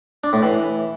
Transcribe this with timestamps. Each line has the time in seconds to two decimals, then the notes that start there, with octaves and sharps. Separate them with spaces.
0.24 D4
0.33 A2
0.42 E3